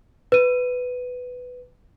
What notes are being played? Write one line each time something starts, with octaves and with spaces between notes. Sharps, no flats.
B4 D#7